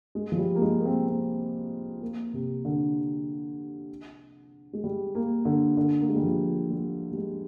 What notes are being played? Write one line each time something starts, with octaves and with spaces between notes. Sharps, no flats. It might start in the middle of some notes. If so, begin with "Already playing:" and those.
G#3
F3
G3
A#3
G#3
A#3
C4
C4
A#3
C3
D3
G#3
G3
A#3
D3
D3
A#3
G#3
G3
F3
G3
G3
G#3